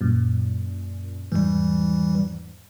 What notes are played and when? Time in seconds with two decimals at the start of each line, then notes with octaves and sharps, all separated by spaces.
0.01 F#2 A#2
1.32 E2 G#2 E3 G3